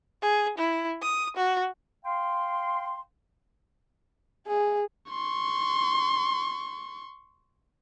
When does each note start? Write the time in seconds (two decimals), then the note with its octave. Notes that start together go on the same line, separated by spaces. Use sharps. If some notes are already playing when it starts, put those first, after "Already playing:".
0.23 G#4
0.58 E4
1.03 D#6
1.37 F#4
2.05 F5 G5 C6
4.47 G#4
5.10 C6 C#6